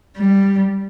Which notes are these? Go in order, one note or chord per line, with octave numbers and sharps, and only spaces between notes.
G3